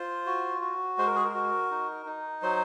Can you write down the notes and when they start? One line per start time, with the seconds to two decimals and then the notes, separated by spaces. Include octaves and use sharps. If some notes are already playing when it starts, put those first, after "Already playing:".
Already playing: F4 C5
0.26 F#4
0.61 F#4
0.98 G#3 C5
1.07 A#4
1.15 G#4
1.25 A#4
1.34 F#4
1.71 D#4
2.06 D#4
2.42 F#3 C5